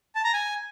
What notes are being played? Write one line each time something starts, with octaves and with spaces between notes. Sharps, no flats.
A5
A#5
G#5